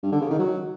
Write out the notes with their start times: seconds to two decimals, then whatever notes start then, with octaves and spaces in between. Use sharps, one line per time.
0.03 G2
0.12 D3
0.21 C#3
0.30 D#3
0.39 F#3